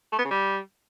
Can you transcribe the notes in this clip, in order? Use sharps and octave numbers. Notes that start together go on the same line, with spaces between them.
A3
B3
C#3
G3